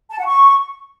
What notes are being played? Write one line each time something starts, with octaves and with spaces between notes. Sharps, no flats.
A5
F#5
C#6